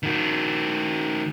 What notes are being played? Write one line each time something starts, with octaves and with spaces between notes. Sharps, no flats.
D#3 F#4